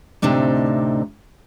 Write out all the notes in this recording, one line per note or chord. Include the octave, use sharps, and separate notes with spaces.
D2 A2 C3 C4 D4 D#4